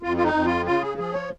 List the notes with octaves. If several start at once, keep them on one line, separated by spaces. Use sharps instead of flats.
F2 F4
F4
D#4
F2
F4
C#3 F4
G#4
F3 G#4
C#5